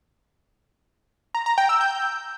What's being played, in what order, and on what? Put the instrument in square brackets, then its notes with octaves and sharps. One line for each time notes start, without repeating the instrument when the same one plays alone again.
[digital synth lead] A#5
A#5
G5
E6
G6